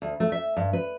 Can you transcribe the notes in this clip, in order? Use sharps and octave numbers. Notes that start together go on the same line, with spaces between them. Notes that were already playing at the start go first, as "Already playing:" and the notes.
D2
A3
E5
G2
B4